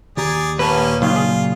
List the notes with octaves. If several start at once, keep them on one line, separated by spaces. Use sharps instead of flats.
D#2 G4 G#4 D5 A#5
A#2 A#3 C#4 B4 A5
D#2 C#3 F#3 F4
G#4